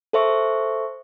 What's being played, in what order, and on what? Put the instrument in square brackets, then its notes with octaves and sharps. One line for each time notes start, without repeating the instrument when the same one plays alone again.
[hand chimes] A4 C5 E5 C#6